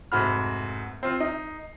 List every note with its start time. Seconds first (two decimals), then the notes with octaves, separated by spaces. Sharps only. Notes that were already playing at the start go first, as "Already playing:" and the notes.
0.12 F1 G#2 A3 F#4 B5 F6
1.03 C4 F4
1.20 D#4